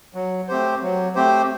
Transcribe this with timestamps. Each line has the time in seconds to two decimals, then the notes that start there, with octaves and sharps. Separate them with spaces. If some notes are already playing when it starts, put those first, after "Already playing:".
0.15 F#3
0.48 A3 C4 G4 C5
0.82 F#3
1.15 A3 C4 G4 C5